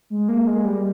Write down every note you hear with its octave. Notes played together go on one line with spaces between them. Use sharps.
G#3
A#3
G#3
G3